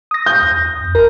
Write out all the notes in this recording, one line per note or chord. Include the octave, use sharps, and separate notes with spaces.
D#6 A#6
G6
E2
F2
G#1 A#4